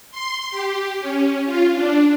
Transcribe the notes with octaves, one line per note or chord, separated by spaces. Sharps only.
C6
G4
C#4
F4
D4